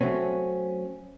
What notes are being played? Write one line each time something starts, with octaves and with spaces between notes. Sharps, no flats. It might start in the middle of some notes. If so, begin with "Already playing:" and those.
F#3 A3 C4 C#4